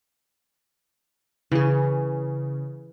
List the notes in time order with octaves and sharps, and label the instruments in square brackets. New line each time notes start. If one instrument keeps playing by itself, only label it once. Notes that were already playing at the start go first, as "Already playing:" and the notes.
[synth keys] C#3 [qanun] E3 G#4